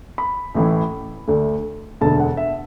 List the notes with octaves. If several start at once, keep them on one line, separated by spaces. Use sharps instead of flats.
B5
A1 A2 E3
D2 D3 A3
E1 D2 D3 A5
F#5
E5